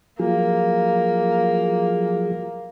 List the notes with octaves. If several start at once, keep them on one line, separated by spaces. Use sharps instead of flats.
F3 F#3 A#3 G#4